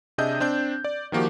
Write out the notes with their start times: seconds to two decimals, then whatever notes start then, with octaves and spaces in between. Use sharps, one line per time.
0.18 C3 D4 G#4 D#5 E5 G6
0.40 C4 D4 G6
0.84 D5
1.12 D#3 F3 A#3 F#4 G4